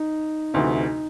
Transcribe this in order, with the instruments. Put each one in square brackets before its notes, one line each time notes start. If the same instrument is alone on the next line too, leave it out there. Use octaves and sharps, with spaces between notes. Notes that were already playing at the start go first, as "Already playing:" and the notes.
Already playing: [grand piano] D#4
[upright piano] D2 C3 E3 A3 [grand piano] D#4